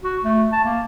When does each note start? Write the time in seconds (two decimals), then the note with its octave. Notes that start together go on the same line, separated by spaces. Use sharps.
0.03 F#4
0.24 A3
0.52 A5
0.65 A#3